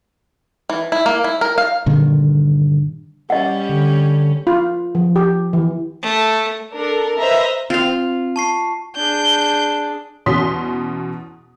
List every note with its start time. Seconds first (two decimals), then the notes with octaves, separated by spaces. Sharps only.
0.70 E3
0.92 E4
1.06 A#3
1.24 E4
1.41 A#4
1.58 F5
1.86 G2 A#2 D3 D#3
3.30 G3 C#4 D#5 F#5
3.69 D3
4.47 F4
4.95 F3
5.16 G4
5.53 E3
6.02 A3
6.75 D4 A4 A#4
7.18 B4 C5 D#5 E5 A#5
7.70 C4 F4 F5
8.36 A5 C#6 C7
8.96 D4 G#4 G6
10.26 E2 B2 C#4 C6 D#6 B6